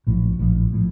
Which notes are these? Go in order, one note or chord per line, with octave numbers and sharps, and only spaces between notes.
A#1 A2 F3
A#1 A2 F3
A2 F3